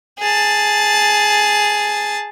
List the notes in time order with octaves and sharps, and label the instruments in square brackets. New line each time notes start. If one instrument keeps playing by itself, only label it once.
[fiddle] G#4 A5